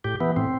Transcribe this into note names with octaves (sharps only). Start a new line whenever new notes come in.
A2 G4
E3 B3
A2 C4